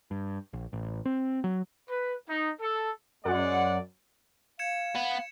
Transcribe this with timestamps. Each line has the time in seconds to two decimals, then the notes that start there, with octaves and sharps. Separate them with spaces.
0.11 G2
0.53 A#1
0.73 A1
1.05 C4
1.44 F#3
1.89 B4
2.28 D#4
2.60 A4
3.25 F#2 G#3 D5 F#5
4.59 F5 G#6 C#7 E7
4.96 B3